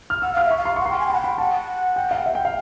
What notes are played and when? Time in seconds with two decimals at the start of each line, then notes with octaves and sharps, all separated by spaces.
0.10 F6
0.22 F#5 E6
0.33 F5 F6
0.45 E5
0.51 C#6
0.57 F5
0.65 C6
0.76 F#5 C#6
0.86 G5 C6
1.00 G#5
1.07 G5
1.10 F#5 B5
1.21 G5 B5
1.38 F#5 A5
1.96 G5
2.11 F5
2.26 E5
2.35 G5
2.45 F5